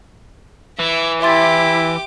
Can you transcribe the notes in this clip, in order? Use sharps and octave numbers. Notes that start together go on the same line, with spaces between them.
E3 E5
E4 G4 E5 C6 D6 A6